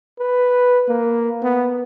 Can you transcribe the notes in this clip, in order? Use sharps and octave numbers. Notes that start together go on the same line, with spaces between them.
B4
A#3
B3